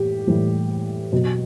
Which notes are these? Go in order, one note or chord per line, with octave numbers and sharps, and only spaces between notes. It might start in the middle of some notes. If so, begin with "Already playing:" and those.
Already playing: A2 E3 G4
A2 E3 G3
B2 F#3